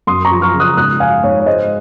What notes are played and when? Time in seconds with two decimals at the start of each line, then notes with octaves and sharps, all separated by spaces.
0.07 F#2 C6 D#6
0.25 A#5 C#6
0.31 F3
0.42 C#6 F6
0.53 C#3
0.60 D#6 F#6
0.77 G#2 D#6 F#6
1.00 F3 F5 G#5
1.24 G#2 C#5
1.40 C#5
1.46 G#3 C5 D#5